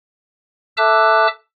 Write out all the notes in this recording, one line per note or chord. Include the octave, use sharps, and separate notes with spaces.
A4 E5 A5 D6 E6 F#6